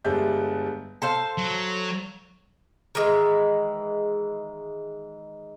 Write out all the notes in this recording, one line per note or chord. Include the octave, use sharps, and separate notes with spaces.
G1 G3 G#3 D5 E5 G6
A4 C5 F5
F#3
D#3 E3 G#3